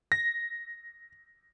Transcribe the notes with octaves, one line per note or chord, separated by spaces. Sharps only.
A#6